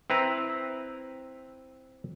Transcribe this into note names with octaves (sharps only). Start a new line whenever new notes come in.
C4 E4 B4 A#5